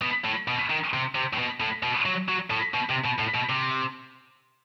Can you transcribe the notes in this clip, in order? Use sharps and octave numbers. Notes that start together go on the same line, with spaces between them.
B2
A2
B2
D#3
C3
C3
A2
B2
A2
B2
F#3
F#3
A2
B2
C3
B2
A2
B2
C3